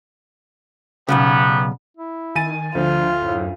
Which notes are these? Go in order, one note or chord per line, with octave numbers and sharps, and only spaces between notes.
B1 F#2 C#3 F#3 G3 B3
E4
D#3 G#5 A6 D#7
D2 D3 F3 F4 C5
F#2 A2